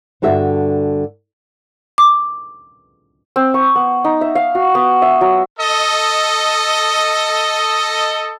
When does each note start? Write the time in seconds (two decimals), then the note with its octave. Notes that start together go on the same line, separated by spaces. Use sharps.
0.22 G2 D3 F#4 E5
1.98 D6
3.36 C4
3.54 C#6
3.76 B3
4.05 D#4
4.21 E5
4.35 F5
4.55 F#4
4.75 B3
5.02 E5
5.21 F#3
5.59 A4 D#5